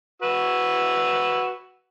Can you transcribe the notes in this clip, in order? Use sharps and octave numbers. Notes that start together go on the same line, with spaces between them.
F#4 B4 E6